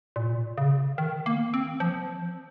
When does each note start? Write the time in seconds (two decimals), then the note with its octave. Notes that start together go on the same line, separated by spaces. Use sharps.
0.16 A#2
0.58 C#3
0.98 D#3
1.26 A#3
1.54 C4
1.80 F3